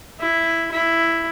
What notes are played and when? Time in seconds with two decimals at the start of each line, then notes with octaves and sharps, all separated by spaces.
0.20 E4
0.72 E4